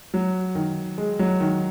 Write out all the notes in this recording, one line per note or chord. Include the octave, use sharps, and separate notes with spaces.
F#3
D#3
G#3
F#3
D#3